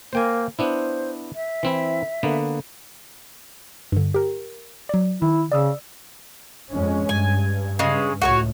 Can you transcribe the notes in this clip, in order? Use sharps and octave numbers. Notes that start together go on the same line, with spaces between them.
A#3 C5 G5 G#5
B3 D4 E4 C5
E5
E3 C4 E4
D3 A#3 B3
G2 D3
G4 A#4
F#3 D5
D#3 E4
C#3 D5 D#6 E6
F2 G#3 C#4
G2 G#5
C#3 G#3
C#2 A2 F#4 A4 C#5